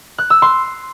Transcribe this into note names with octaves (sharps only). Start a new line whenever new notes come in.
F#6
E6
C6